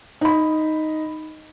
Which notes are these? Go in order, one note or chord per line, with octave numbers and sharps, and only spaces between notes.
D#4 B5